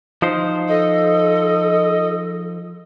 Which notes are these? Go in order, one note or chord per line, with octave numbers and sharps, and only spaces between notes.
F3 D#4 C5
A4 D#5